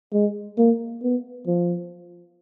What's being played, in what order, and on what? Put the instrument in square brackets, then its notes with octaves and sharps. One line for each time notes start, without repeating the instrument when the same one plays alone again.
[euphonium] G#3
A#3
B3
F3